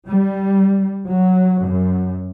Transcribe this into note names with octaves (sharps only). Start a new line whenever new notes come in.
G3
F#3
F#2